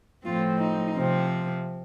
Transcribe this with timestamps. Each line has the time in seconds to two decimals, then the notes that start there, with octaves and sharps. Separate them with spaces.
0.25 A2 F3 C4 F4
0.60 D#4
0.95 C3 F3 C4